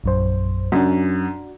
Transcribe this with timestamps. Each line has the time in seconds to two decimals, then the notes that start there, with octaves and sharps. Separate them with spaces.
0.04 A#1 F#2 C5
0.72 F#2 D4 F#4